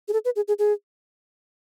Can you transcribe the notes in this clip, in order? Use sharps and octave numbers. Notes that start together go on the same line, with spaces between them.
G#4
A4
B4
G#4
G#4
G#4